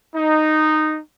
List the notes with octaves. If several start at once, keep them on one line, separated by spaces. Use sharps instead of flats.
D#4